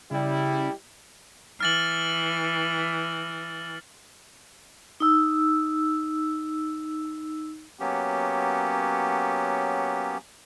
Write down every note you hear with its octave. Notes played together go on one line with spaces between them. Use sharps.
C#3 G3 E4
E3 F6 A6 F#7
D#4 E6
F#3 A#3 B3 C#4 G4